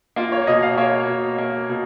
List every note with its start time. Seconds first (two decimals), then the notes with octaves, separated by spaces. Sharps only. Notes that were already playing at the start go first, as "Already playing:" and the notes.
0.16 A#3 F4
0.32 C#5
0.47 B2 D#5
0.62 F5
0.77 A#3 C#5
1.08 B2
1.38 A#3
1.69 B2